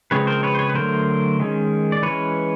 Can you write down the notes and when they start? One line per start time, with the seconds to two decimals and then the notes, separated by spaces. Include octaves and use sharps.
0.11 C#3 F3 G#3 C4 B4 C#5
0.27 A#4 C5
0.43 B4 C#5
0.55 C5
0.59 B4 C#5
0.69 B4
0.75 D3 F#3 A3 A#4 C5
1.40 D#3 G#3 C#4
1.92 D5
2.02 E3 G#3 C#4 B4 C#5